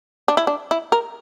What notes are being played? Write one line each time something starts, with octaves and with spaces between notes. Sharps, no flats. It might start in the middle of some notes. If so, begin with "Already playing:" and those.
D4
E4
D4
E4
A#4